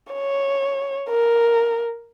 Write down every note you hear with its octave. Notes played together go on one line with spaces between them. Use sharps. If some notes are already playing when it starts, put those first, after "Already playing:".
C#5
A#4